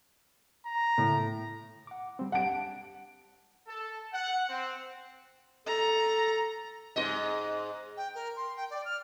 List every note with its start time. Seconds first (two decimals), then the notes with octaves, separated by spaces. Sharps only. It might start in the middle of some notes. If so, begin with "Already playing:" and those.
0.66 A#5
0.98 A2
1.87 F#5 D6
2.19 G3 C4
2.32 G4 F#5 A5 D7
3.67 A4
4.13 F#5
4.49 C4
5.67 A4 A#5
6.96 G#2 F#4 D#5
7.97 G5
8.15 A#4
8.36 C6
8.56 G5
8.71 D5
8.85 F6